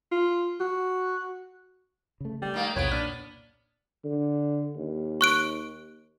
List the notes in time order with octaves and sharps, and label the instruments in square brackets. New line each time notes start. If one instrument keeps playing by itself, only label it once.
[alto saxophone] F4
F#4
[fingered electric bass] C#3 A3
[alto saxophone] G3 [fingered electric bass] A3 B3
[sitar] D#3 A#3
[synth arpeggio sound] B1 E2 D7 [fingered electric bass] C3 [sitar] B3 [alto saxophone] C#5
[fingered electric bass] A#2 [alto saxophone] D4 [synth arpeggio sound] F6
[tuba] D3
D#2
[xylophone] C#6 F#6 D7